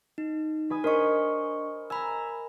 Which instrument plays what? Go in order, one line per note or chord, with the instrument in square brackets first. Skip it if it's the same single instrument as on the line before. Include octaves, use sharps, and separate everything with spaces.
[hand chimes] D#4
[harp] B4 G#5 D#6
[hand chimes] D4 C#6 [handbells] A#4 [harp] C5 D#5
[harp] G#5 A#5 [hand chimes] B5 E6